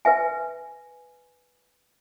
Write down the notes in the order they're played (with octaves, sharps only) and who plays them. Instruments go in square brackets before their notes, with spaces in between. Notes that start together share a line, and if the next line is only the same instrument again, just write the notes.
[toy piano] B4 E5 G#5